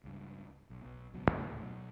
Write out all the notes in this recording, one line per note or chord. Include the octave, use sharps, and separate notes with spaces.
C#2 G2
B1
B1
D1 C#2 B2 F#3
D2 A2 C#3 A3
B2 F#3